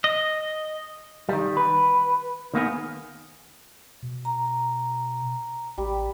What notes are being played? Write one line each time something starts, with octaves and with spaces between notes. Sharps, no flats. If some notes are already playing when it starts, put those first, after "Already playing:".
D#5
D#3 G3
B4
D#3 A#3 B3 G#4
B2
A#5
A1 G3